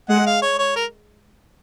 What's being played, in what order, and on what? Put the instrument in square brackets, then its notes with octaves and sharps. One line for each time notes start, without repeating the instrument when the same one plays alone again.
[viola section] G#3 [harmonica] F#5
[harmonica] F5
C#5
C#5
A#4